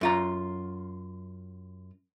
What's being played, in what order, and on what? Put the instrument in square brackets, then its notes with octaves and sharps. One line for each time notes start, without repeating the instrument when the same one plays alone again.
[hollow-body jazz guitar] F#2 F4 A#5